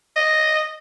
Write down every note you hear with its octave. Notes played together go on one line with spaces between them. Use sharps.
D#5